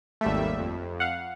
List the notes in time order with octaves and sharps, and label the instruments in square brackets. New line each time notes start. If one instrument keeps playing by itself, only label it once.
[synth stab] G#1 A3 [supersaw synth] D#2 G3 E5
[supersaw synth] F2
[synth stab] F5 F#5